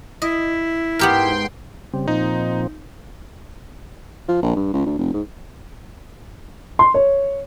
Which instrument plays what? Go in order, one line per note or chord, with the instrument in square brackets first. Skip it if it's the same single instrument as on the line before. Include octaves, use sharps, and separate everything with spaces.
[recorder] E4 [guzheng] D#5
[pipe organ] G#2 G5 C6 [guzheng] B3 G4 A#4
[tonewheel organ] C#3 G3 C4
[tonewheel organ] A#2 F3 C4 [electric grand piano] D#4
[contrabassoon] F3
A#1
G2
C#2
D2
F1
G#2
[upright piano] C6
C#5